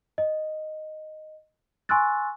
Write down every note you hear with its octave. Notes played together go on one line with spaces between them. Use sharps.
D#5
G#5 C6 C#6 E6 F#6 A6